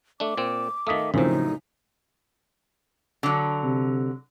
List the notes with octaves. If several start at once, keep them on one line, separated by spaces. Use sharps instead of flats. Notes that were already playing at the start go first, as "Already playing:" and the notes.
A3 D4 D6
A#2 C4
D#3 A3 F5 D#6 B6
F#2 A2 C#3 F3 C4 D#4
D3 F#3
C3